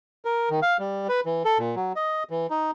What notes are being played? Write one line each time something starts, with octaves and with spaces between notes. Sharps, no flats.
A#4
D#3
F5
G3
B4
E3
A4
A#2
F#3
D#5
E3
D#4